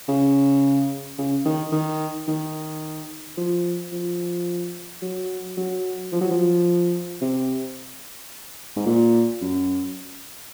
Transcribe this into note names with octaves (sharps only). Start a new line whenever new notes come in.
C#3
C#3
D#3
D#3
D#3
F3
F3
F#3
F#3
F3
F#3
F3
C3
G#2
A#2
F#2